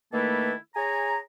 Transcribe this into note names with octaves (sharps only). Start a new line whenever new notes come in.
D#3 A3 A#3 E4 A4 B4
G#4 C#5 G#5 A#5